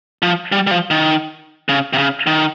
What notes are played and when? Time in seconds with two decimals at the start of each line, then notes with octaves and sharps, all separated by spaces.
0.22 F3
0.52 G3
0.67 G3
0.71 F3
0.90 D#3
1.69 C#3
1.93 C3
1.98 C#3
2.27 D#3